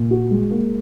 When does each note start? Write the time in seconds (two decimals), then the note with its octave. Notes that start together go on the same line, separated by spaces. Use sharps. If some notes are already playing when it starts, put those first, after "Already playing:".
Already playing: A#2
0.11 F#4
0.31 G#3
0.51 A#3